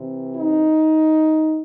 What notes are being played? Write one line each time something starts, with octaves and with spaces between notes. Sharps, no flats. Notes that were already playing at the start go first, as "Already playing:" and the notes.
Already playing: C3 E3
D#4